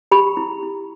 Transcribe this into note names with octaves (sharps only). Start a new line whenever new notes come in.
G4 B5
E4
E4